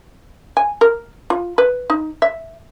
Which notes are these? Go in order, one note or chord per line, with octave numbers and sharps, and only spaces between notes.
G#5
A#4
F4
B4
D#4
E5